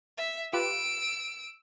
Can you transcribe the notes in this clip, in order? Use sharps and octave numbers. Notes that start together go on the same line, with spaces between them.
E5
F4 G4 B4 E6 D7